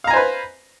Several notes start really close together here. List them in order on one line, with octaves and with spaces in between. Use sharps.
F5 A#5 G#5 C5 B4